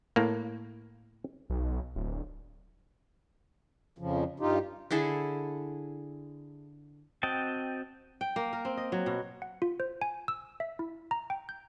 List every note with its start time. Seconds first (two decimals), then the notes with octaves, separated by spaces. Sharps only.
0.16 A2 A#3
1.50 B1
1.96 D1
3.98 F2 C#3 F3
4.40 G2 D#4 F4 G4
4.91 D3 E4 G#4 A4
7.23 C4 F#4 D#5 G5 A5
8.21 G5
8.36 A#3
8.53 A#4
8.65 C4
8.77 D#5
8.92 F#3
9.06 B2
9.42 F#5
9.62 F4
9.80 C5
10.02 G#5
10.28 E6
10.60 E5
10.79 E4
11.11 A#5
11.30 G5
11.49 G6